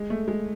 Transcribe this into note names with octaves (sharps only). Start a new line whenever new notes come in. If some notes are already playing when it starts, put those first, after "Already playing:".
Already playing: G#3
A3
G#3